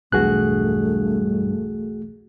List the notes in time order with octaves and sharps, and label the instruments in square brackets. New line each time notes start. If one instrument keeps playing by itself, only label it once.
[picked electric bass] B1 E2 B2 [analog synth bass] G2 [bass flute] A3 [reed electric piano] F#4 G#4 F#6